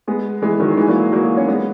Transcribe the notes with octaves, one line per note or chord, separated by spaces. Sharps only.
G#3 B3
E3 G#3
D#3 F#3
E3 G#3
F#3 A#3
F#3 A#3
C#4
G#3 B3